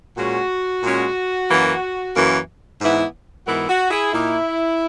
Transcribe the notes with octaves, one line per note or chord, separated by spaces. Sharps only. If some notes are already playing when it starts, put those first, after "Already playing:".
A#2 G#3 C#4 F#4
A#2 G#3 C#4
F#2 E3 A#3
F#2 E3 A#3
G#2 E3 B3 E4
G#2 E3 B3 E4 F#4 A#4
F#4
E4 G#4
A#2 A#3 D#4 E4